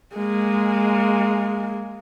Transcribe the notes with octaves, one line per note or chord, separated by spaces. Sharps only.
G#3 A#3